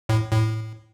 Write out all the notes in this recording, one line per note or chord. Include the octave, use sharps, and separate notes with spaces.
A2
A2